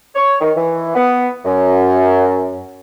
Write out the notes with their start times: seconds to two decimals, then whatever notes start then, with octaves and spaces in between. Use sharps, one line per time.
0.15 C#5
0.41 D#3
0.57 E3
0.95 B3
1.45 F#2